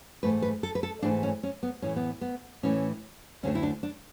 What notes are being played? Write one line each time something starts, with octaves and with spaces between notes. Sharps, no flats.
G#2 E3 A3 B4
B4
A4
B4
A4
G#2 E3 A3 D4
C#4
C#4
B3
A2 E3 A3 C#4
B3
B3
A2 E3 A3 C#4
D2 D3 A3 C#4
E4
D4
D4